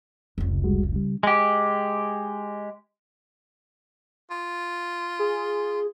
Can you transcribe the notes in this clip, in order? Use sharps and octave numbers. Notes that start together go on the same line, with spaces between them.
F1 C#2
G3 G#3 F#4
C#3 G3
G#3 G4
F4
G#4